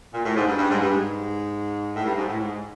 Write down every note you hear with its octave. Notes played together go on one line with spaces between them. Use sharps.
A#2
A2
G#2
G2
G2
G#2
G2
G#2
A2
G2
G#2
A2
G#2